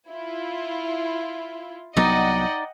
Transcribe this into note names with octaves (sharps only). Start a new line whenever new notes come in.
E4 F4
C2 F#3 B3 D#4 D5 D#5 F#5 G5